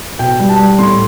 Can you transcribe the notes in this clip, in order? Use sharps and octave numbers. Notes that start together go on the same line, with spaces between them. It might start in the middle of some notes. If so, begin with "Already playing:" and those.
B2 G5
G3
A5
G3
A2 C6